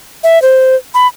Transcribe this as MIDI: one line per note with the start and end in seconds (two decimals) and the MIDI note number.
0.24 0.41 76
0.42 0.76 72
0.94 1.07 83